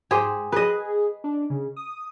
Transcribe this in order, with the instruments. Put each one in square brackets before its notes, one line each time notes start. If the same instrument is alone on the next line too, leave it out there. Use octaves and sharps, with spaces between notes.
[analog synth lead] G#2 [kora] G4 G#4 C5
[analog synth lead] G#4 [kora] B4 D#5
[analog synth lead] D4
C#3
D#6